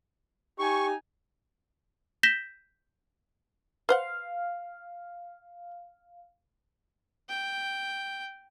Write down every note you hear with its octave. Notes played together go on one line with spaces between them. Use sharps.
D#4 G4 G#5 C#6
G6 A#6 B6 E7 G7
B4 C5 F5 F#5
G5